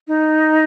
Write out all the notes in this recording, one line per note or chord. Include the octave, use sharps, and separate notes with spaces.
D#4